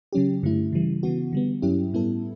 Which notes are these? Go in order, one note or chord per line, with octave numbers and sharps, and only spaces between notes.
C#3 F#3 C#4 G4
G2 D3 A3 E4
C#3 E3 G3
C#3 E3 B3 F#4
D3 G3 B3
G2 F#3 C#4 E4 G4
A2 G3 B3 E4 A4